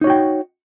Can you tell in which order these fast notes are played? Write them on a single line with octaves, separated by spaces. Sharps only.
D#4 C#5 F#4 G5